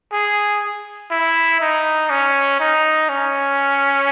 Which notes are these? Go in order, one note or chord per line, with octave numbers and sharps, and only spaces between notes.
G#4
E4
D#4
C#4
D#4
C#4